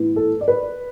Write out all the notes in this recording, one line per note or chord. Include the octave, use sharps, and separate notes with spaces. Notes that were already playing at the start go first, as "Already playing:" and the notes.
Already playing: A2 E3 B3
A4
D5
B4